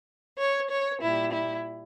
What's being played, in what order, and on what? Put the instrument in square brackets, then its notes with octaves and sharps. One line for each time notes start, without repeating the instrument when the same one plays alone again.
[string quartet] C#5
C#5
A#2 G3 E4
E4